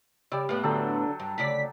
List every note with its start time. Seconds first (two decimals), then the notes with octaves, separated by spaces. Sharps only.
0.32 C#3 G3 D5 E6
0.49 A2 B3 F5
0.64 D3 F#3 A4 G5
1.20 G2
1.38 D2 C#3 D5 B6